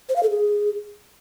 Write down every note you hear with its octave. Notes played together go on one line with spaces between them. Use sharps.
C5
F5
A4
G#4